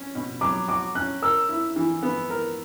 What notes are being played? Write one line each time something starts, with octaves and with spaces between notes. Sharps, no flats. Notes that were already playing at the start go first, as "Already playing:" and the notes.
Already playing: C#4
B2
F#3 D6
F#4 D6
C#4 F#6
A#4 E6
E4
E3
B3
A#4